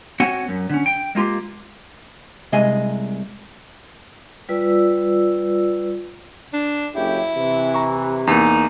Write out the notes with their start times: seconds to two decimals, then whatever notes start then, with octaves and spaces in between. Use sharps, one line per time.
0.20 C4 F#4 C#5 F#5 G#5
0.48 F#2
0.70 D3 C#4
0.86 G5
1.15 G#3 A#3 F4 G4
2.52 C2 C3 G#3 D#5 G#5
4.49 G3 F4 B4 D5 E6
6.53 D4
6.95 F#1 C#3 E4 G4
7.34 C3 E3
7.74 A#5 C#6
8.27 E2 A#3 D#4